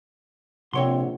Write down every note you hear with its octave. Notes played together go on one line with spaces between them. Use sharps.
A#1 C3 C4 C#5 F#5 C6